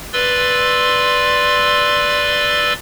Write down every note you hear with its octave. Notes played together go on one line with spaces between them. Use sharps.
B4 D5 C6 E6